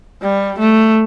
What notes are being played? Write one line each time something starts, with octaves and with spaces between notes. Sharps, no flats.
G3
A3